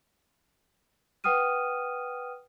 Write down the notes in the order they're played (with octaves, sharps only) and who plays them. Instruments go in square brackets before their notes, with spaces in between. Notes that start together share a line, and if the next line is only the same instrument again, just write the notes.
[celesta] B4 F#5 G5 D#6 F6 D#7